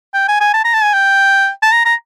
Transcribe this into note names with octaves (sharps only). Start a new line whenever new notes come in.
G5
G#5
G#5
A5
A#5
A5
G#5
G5
A5
A#5
A#5